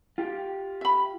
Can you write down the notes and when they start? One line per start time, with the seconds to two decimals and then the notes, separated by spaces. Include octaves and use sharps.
0.18 F4 G4
0.81 E5 B5